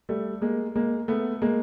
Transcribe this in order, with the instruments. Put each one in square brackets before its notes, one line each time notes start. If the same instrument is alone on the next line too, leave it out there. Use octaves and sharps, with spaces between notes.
[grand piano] G3 A3
G#3 A#3
G#3 A#3
A3 B3
G#3 A#3